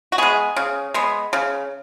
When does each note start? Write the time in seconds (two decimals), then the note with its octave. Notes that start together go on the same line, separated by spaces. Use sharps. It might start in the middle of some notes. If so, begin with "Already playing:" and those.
0.12 F#4
0.18 G#3 B3 G#4
0.56 C#3
0.94 G#3 B3
1.33 C#3